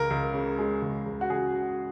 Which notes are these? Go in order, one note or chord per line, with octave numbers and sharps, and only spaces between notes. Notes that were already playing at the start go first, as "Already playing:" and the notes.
Already playing: C#2 A#4
C#2
C#3
G#3
C#2
C#2
F#4
C#3 G#4